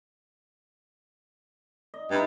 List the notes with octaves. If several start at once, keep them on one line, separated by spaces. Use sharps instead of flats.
D#5
G2 D#4 E4